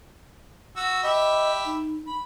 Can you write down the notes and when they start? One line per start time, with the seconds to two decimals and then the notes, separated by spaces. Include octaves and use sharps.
0.76 F#4 E6
1.03 G4 D#5 E5 B5
1.66 D#4
2.06 B5